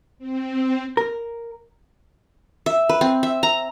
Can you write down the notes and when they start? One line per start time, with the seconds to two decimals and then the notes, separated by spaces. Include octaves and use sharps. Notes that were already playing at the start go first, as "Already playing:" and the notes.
0.19 C4
0.97 A#4
2.66 E5
2.89 B4
3.01 C4
3.23 E5
3.43 A#5